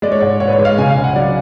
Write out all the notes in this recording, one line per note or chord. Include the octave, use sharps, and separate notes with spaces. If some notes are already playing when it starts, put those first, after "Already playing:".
G#3 D5
C#5
G#2 D5
G#2 C#5
B4
C#5
G#3
F5
C#3 G#5
F5
C#2
F#5
F#3 D5